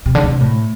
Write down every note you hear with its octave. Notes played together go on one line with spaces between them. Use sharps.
C3
D3
C3
A2